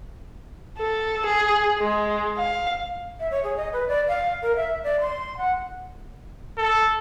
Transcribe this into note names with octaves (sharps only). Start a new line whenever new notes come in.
A4
G#4
G#3
F5
E5
C#5
G#4
D#5
B4
D5
F5
A#4
E5
D5
C6
F#5
A4